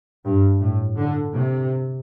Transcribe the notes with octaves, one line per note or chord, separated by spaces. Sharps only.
G2
A2
D3
C3